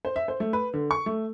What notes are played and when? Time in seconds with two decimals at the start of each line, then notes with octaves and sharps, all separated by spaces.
0.05 C5
0.16 E5
0.28 C5
0.40 A3
0.53 B4
0.74 D3
0.91 C#6
1.06 A3